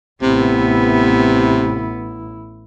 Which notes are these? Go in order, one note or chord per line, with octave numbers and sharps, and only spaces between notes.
A1 C3 B3 E4